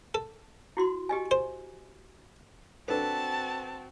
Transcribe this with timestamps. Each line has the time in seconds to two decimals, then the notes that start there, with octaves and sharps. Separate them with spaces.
0.14 A4
0.77 E4 F#4 C6
1.09 G4 D#5 G#5
1.31 C5
2.88 C4 D4 F#4 A4 B4 A5